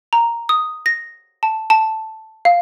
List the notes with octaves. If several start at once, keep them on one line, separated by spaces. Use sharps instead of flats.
A#5
D#6
A#6
A5
A5
F5